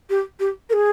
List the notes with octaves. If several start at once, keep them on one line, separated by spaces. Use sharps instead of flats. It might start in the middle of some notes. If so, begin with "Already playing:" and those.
G4
G4
A#4
G#4